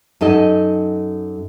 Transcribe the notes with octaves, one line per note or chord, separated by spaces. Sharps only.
F#2 D#4 A4 D#5